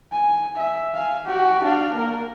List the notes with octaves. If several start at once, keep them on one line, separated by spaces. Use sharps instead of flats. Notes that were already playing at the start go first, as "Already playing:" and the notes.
G#5
E5
F5 G#5
F#4 G4
D4 F5
A#3 A#4